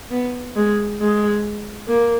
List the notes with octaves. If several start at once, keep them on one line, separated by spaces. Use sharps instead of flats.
B3
G#3
G#3
A#3